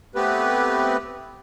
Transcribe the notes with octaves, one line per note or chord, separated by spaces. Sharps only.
A3 B3 C4 G4 B4